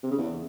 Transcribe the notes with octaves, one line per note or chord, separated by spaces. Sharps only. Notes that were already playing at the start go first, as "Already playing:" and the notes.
C3
C#3
E2